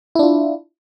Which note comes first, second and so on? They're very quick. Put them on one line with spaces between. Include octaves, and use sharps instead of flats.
E4 D4 F4